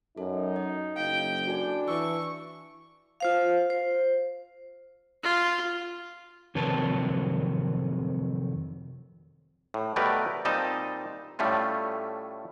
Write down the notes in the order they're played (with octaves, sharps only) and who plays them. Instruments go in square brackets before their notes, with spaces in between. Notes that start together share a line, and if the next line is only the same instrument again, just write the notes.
[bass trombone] F#2 [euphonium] D#4 [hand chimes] A4
[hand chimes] D#5
[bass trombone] F#1 [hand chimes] D#5 F5 [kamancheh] G5
[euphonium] D4 [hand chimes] F#4 A4 G#5
[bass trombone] E3 [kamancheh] C#6 [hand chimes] E6
[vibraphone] F4 C5 F5
C5
[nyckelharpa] F4
[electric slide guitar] F2 C3 D#3 F#3 B4 A5
[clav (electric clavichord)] A2
B2 G3 A3 G4 A#4 B4
A#2 G3 C4 D#4 D#5 A5
A2 G3 A3 C#4 F4